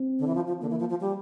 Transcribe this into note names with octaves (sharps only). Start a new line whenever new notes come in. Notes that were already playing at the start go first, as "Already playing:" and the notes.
Already playing: C4
D3
E3
F3
F3
D3 A#3
E3
F3
F3
G3